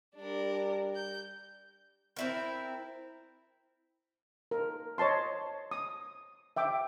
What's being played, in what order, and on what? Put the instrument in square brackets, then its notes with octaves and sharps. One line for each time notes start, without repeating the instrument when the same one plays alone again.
[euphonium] G3 [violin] D4 A#4
[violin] G6
[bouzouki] C4 E4 A#4
[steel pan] A#4
C#5 D#5 A5 C6
D#6
E5 G5 D6